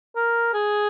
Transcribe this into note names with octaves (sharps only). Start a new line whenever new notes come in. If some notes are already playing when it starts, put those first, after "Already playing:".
A#4
G#4